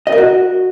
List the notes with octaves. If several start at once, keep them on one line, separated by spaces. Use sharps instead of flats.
D#5
A#4
F#4